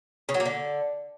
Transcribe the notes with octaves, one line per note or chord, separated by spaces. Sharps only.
C#3
F#3
A#3
D3